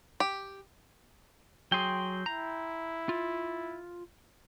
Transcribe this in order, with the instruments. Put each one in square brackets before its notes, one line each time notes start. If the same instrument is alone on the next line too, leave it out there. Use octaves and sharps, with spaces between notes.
[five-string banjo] G4
[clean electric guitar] F#3 G#4 [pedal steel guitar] G5 C6
[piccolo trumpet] E4 [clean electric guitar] A#5
[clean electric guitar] F4